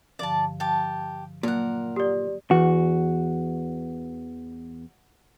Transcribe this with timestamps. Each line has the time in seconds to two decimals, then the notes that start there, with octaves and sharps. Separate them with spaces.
0.19 G2 D3 F3 D5 A5
0.60 F3 G4 A5
1.43 A#2 F#3 A#3 A#4 F#5
1.96 G4 D5 D#6
2.51 E2 F#4